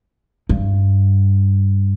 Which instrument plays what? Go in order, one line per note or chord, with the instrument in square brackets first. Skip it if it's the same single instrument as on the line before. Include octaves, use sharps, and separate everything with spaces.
[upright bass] G2